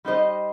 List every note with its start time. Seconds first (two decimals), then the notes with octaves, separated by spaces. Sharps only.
0.05 G3 D#4 G4 C5 D#5